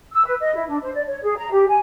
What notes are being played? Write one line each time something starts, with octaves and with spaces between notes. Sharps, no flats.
E6
B4
D#5
E4
D4
C5
D5
C#5
G#4
A#5
G4
G#5